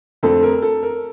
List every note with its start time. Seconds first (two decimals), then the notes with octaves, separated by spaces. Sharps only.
0.23 F2 D3 A3 C4 A4
0.43 A#4
0.62 A4
0.83 A#4